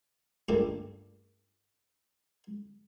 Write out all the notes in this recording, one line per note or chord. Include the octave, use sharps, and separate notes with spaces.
G2 A#2 C#3 G3 A3 D4